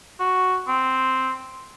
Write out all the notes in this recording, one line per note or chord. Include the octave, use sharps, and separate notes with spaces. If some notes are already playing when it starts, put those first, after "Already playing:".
F#4
C4